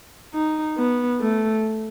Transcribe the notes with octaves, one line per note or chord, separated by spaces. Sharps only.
D#4
B3
A3